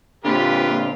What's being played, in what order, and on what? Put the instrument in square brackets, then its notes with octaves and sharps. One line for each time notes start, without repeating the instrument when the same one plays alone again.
[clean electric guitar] A#2 D3 [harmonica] F4 G4 B4